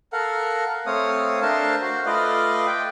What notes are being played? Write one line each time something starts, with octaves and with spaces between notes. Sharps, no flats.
A4 A#4 F5 F#5
A3 C4 C#5 F5 D#6
A3 D4 A#4 C5 F5 A5
F#4 C5
A3 F4 B4 D5 D#5 F5
G5